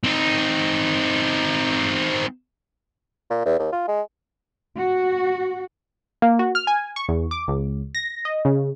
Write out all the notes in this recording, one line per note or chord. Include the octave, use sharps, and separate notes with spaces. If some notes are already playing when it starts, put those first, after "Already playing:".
C4 D#4
A#2
E2
D#2
F4
G#3
F#4
A#3
F#4
F6
G#5
C#6
E2
D6
C#2
A#6
D#5
C#3